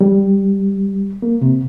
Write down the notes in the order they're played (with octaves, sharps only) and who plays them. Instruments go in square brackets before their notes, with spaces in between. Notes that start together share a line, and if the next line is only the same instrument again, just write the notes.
[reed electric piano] G3
A#3
C3